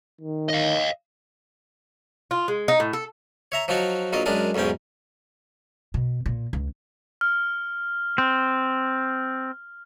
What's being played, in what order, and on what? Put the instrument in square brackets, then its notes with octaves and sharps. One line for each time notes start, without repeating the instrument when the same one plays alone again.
[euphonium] D#3
[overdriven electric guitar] D#5 F5
[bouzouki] F4
G#3
D#4
A2
A4
[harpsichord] C#5 E5 A#5
F3 F#3 D#4 F4 F#4
A#1 F#3 F4 D#5
F#2 G#3 D4 A#4 D#6
B1 E2 G#2 C#4 G5
[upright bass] B2
A#2
C#2
[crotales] F6
[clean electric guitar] C4